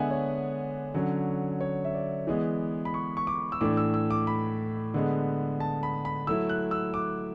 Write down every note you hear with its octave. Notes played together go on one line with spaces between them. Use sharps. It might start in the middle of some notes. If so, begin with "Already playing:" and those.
Already playing: D3 G#3 B3 D4 E5 F#5 G#5
C#5
D3 F#3 C#4
C#5
E5
D5
E3 G#3 B3
B5
C#6
C#6
D6
E6
A2 E3 A3 D4 D6
E6
E6
D6
B5
D3 G#3 B3
A5
B5
B5
F#3 A3 E4 E6
F#6
E6
D6